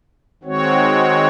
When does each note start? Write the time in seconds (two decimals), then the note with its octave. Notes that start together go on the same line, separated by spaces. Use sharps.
0.43 D#3 G#3 C4 F#4 C#5